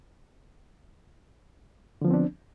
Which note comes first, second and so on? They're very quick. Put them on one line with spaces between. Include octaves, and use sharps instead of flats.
D3 F3 B3 C4 D4